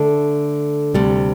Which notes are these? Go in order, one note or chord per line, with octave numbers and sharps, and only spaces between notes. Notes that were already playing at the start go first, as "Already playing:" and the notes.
Already playing: D3 A3 A4
D2 C3 G3